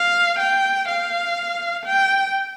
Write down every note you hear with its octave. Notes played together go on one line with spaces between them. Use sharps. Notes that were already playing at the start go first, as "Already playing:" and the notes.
Already playing: F5
G5
F5
G5